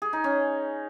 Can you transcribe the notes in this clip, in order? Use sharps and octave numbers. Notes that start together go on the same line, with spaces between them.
G#4
D#4
C#4